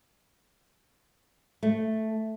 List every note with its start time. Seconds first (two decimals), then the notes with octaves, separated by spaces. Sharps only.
1.63 A3